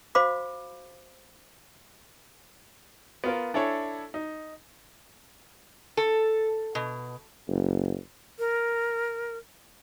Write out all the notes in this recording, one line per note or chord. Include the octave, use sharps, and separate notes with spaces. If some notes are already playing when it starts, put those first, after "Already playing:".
F#4 C5 F5 B5 D6
B3 F4 A#4
D4 E4 A4 C#5 G#5
D#4
A4
B2
F#1
A#4